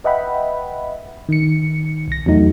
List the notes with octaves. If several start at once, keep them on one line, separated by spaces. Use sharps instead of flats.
B4 D#5 E5 F#5 G5 B5
D#3 C#7
C2 A#6
E2 F#3 A3 D#4 F#4